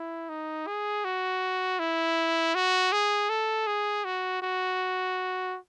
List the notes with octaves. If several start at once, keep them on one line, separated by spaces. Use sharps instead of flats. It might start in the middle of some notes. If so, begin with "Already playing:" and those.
Already playing: E4
D#4
G#4
F#4
E4
F#4
G#4
A4
G#4
F#4
F#4